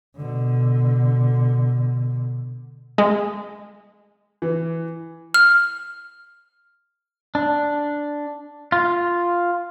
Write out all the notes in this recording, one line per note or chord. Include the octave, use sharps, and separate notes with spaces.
B2 D3
G#3
E3
F6
D4
F4